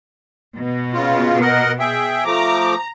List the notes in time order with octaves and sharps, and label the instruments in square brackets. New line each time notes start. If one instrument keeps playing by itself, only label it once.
[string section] B2
[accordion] C#3 F4
A#4 D#5 F#5
G#4 E5 G5
[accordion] F3 A3 D6 [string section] A#5